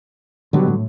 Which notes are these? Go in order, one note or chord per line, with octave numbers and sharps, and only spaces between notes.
B2 D3 F#3 G3 B3
A2